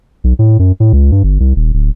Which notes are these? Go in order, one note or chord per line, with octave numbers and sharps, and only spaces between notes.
B1
A2
F#2
A2
C#2
G2
G1
C2
D#1
D1